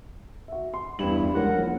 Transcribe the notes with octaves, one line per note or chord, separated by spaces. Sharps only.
F#4 E5
C6
E2 G2 E4 E7 F#7
C#2 F3 A#4 F#5
A#1